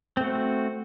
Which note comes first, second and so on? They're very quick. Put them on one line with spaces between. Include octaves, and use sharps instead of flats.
C4 A3 F#4